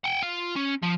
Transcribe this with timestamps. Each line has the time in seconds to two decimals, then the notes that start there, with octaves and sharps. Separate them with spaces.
0.04 F#5 G5
0.23 F4
0.56 C#4
0.83 F3